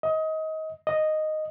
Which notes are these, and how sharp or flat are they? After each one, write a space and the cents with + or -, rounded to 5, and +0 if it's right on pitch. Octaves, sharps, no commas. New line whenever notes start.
D#5 +25
D#5 -5